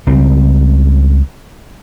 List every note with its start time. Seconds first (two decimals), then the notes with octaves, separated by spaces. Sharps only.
0.07 C#2 C#3 G3 C4